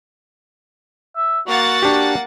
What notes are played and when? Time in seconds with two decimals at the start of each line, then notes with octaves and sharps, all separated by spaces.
1.16 E5
1.47 A#3 F#4 F#5 A6
1.82 D4 G4